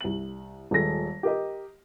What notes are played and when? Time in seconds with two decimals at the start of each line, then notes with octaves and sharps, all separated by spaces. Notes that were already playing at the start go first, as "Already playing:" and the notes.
0.01 C2 F#7
0.71 D#1 G#3 A4 A#6
1.23 G4 A#4 D#5